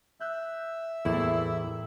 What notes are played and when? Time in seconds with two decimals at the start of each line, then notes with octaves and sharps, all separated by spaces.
0.20 E5 F#6 G6
1.05 E2 A2 G3 A#3 E4